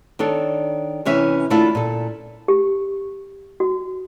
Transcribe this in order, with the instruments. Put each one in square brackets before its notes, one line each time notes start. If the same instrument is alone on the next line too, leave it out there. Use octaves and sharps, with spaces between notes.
[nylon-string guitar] D#3 D4 A4 C#5
C3 E3 C#4 E5
D3 A3 A#3 D4 E4 F4
A#2 A4
[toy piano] G4
F#4